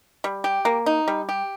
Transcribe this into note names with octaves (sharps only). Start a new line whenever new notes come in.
G3
G4
A#3
D#4
G3
G4